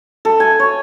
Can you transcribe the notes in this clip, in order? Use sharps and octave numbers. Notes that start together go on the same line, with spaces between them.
A4
G#5
C#5